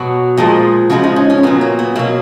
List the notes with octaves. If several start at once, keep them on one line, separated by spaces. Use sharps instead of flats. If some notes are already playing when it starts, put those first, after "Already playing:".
Already playing: B2 F#3 F#4
A#2 F3 G#3
C#3 F3 G#3 F#4
D#4
C#4
C#4
A#2 F#3 B3
A#3
B3
B2 F#3 A#3